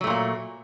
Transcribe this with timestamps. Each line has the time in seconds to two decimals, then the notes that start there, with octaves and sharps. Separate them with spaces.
0.01 F#3
0.04 A3
0.07 A#2
0.10 A#3